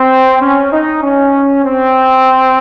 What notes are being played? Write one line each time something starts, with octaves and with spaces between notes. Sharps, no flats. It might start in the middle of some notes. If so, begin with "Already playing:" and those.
Already playing: C4
C#4
D#4
C#4
C4